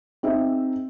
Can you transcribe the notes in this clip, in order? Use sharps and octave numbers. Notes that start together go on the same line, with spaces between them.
C4 D#4 G#4 E5